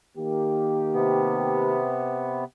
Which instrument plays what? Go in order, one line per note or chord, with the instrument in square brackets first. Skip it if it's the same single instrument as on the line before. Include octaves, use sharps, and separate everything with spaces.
[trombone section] D#3 A#3 G4
[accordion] C3 B3